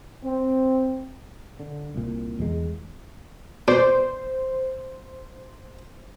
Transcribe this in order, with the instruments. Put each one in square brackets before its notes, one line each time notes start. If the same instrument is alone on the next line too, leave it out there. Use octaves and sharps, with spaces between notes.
[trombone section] C4
[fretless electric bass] D3
C2 A#2
E2 G#3
[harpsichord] B2 [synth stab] C5 [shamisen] D5